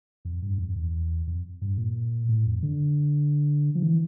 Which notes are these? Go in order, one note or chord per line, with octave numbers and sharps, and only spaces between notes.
F2
G2
F2
E2
F2
G2
A#2
A2
F2
D3
F3
E3